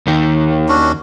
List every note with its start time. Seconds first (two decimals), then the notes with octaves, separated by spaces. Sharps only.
0.07 D#2 D#3
0.69 C#4 D4 F#4